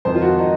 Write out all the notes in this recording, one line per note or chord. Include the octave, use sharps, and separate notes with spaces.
F2 D#3 C5
F4
F#4
D#4